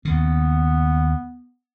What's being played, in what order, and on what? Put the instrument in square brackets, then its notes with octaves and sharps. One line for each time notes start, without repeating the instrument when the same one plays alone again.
[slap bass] D#2 C#3 [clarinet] B3